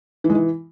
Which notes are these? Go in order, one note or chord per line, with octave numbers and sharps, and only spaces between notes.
E3
G#3
E3